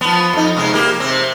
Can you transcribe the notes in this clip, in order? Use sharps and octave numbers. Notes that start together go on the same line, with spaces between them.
F3 B3
F2 D#4
C3 G#3 B3
A#3 G4
C3 C4